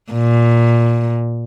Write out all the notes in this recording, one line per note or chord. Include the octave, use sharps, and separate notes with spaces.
A#2